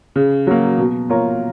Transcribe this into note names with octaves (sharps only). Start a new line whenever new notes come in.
C#3
F#3 A#3
B2
A#3 F4 A#4 C#5